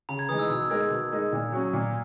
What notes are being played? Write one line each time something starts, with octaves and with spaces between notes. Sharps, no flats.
C#3 A#5
G#6
E3 G#3 D#4 D#6
E6
B2 E6
G#3 D#4 A#4 G#6
B2
G#3 D#4 A#4
A#2
F#3 C#4
A#2